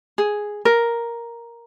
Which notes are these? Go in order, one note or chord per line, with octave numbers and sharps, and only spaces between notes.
G#4
A#4